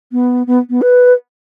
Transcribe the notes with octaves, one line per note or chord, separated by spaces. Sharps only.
B3
B3
B3
B4